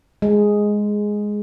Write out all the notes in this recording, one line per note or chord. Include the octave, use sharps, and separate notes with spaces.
G#3